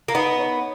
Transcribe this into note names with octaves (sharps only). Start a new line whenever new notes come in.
A#3
B3 D#4
C#5